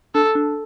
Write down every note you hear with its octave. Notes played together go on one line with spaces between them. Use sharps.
D4 A4
D4